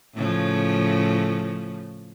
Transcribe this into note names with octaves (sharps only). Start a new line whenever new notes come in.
A2 C#3 F3